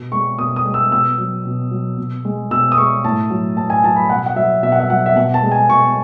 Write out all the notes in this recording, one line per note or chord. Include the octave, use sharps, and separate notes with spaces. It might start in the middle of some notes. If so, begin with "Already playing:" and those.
Already playing: B2
G#3 C#6
B2 D#6
D#6
G#3
E6
B2 E6
F#3
B2
F#3
B2
G#3
B2 E6
D#6
G#3 C#6
A2 A5
F#3
A2 A5
G#5
F#3 A5
B5
B2 F#5
F#5
F#3 E5
B2 E5
F#5
E5
F#3 F#5
E5
B2 F#5
A5
G#3
G#5
B2 C#6